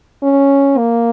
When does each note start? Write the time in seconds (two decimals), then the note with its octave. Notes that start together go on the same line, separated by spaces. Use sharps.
0.23 C#4
0.77 A#3